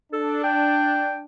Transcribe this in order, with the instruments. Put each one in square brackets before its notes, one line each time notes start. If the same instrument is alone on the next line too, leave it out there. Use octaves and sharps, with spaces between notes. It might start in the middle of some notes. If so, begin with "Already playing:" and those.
[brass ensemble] D4 [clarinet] A4
[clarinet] G5